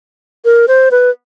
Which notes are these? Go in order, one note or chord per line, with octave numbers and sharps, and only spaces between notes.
A#4
C5
B4